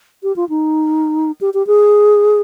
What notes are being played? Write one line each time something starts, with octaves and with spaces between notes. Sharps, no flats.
G4
F4
D#4
G4
G4
G#4